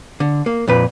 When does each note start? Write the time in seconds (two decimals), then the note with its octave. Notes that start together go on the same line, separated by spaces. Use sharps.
0.20 D3
0.46 A#3
0.68 F2 A#2 B4